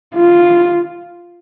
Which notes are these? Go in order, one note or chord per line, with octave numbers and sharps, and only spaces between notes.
F4